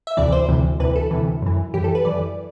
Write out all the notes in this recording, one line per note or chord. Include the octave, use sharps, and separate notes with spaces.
E5
D2 C3 E3 D5
C5
D2 C3 E3
D2 C3 E3 B4
A4
D2 C3 E3
F#2 E3
F#2 E3 G4
A4
B4
F#2 E3 D5